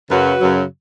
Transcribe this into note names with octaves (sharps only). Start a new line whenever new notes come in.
F#2 C#3 F#3 F#4 B4
F#2 C#3 F#3